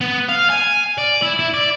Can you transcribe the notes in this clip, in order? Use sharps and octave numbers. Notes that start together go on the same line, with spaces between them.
B3
F5
G#5
D5
E4
E4
D5